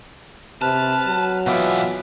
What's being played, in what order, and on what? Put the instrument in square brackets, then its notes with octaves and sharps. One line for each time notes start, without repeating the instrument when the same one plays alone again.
[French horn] C3 [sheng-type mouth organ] B4 F6 [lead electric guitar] A5
[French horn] F#3
[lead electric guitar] B2 E3 [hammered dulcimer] B3 D6 [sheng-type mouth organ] F4 E5